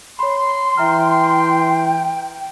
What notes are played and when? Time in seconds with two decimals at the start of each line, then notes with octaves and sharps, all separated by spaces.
0.19 C#5 B5 C6
0.77 E3 E5 G5 A#5 F6